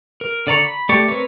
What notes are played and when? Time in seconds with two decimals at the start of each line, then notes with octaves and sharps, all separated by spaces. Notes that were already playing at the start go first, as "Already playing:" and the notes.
0.21 A#4
0.47 D3 D5 A#5 C#6
0.64 B5
0.89 A3 G4 D5 C#6
1.08 C4 A#4 B4 C#5